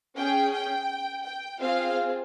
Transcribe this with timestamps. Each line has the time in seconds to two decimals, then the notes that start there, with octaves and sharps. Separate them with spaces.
0.16 C#4 G#4 G5
0.52 G5
1.24 G5
1.60 C4 F4 G#4 F5